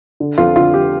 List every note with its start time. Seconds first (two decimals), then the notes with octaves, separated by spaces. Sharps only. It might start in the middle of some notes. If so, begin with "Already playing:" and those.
0.20 D3
0.38 F2 F4
0.56 D3 F4
0.74 F2 G4